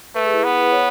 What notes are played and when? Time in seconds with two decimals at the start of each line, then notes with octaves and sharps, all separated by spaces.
0.15 A3 B4
0.25 G#4
0.34 E4
0.44 B3
0.71 C#5